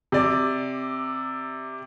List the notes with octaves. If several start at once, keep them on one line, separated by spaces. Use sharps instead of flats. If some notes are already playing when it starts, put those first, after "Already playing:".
C3 D5